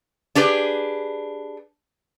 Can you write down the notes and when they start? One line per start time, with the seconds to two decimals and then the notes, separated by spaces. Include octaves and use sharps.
0.35 D4 G4 G#4 B4